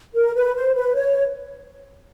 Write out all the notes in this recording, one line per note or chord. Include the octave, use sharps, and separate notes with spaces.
A#4
B4
C5
B4
C#5